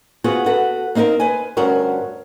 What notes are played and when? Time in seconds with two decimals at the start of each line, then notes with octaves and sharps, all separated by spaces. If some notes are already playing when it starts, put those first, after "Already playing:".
0.24 B3 C4 F4 F#4 G#4
0.46 F#4 A4 B4
0.95 A#3 C4 D#4 G#4 A#4
1.20 B4 C5 G#5
1.57 D2 G2 C#4 F#4 A#4 C5